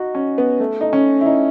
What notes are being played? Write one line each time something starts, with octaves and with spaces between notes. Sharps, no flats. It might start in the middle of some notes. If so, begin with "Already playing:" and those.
Already playing: D#4 F#4
C#4
B3
A3
D#4
C#4
E4
D#4